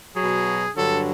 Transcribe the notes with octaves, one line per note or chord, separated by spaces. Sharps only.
B2 F#3 G#4
G2 D3 F#3 A4